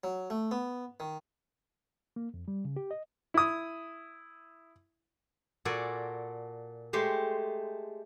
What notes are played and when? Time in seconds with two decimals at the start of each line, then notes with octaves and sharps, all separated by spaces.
0.04 F#3
0.30 A3
0.51 B3
1.00 D#3
2.16 A#3
2.34 F2
2.48 G3
2.65 C#3
2.76 G4
2.91 D#5
3.34 E4 D#6
5.65 A#2 F#4 A4 D5 G#5
6.93 G#3 A3 G4 C5